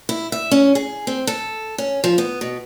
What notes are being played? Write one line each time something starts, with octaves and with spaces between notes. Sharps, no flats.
E4
E5
C#4
G#4
C4
A4
C#4
F3
B3
B2